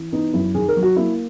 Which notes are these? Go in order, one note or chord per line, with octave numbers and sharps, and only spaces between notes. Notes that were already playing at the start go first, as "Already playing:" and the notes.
Already playing: E3
B3 D#4
F#2 E4
D#3 G#4
A#4
F#3
F#4
A#3 E4